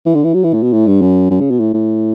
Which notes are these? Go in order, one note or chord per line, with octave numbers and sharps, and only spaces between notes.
E3
D3
E3
F#3
E3
A2
B2
A2
G2
F#2
F#2
C#3
B2
A2
A2